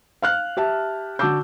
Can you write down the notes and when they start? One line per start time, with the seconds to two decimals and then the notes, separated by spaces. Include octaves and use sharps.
0.22 F5 F6 F#6
0.57 G4 E5 A5
1.19 D3 F#4 A5 D6 E6 G6